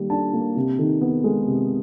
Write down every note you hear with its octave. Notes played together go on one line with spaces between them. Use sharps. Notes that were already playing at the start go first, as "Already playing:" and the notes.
Already playing: D#3 G3 A#3
D4 A5
A#3
C3
D#3
B3
G#3
C3